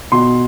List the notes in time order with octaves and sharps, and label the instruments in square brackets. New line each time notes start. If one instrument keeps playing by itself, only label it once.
[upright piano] B2 C6